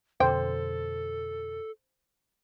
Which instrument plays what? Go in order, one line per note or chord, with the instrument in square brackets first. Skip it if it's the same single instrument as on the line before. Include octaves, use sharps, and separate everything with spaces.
[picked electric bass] F2 B2 D3 [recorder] A4 [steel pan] C5 [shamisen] G5